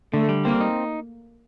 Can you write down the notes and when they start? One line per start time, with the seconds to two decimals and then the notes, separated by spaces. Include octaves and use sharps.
0.14 D3 A3
0.29 G3
0.45 A#3 C4
0.61 D#4